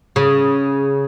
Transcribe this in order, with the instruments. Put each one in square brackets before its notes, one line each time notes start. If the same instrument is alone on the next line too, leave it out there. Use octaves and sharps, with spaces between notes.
[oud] C#3